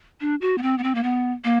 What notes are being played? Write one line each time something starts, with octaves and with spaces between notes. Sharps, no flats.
D4
F#4
B3
C4
B3
C4
A#3
B3
A#3